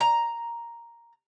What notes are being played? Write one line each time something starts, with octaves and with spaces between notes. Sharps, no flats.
A#5